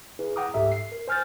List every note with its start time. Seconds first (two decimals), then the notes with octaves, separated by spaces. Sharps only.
0.19 E4 G#4 B4
0.36 F#5 G5 A#5 D6 D#6
0.54 C#2 G#2 G4 A4 E5
0.72 C7
0.92 A#4
1.08 C5 G#5 F6 G6 A6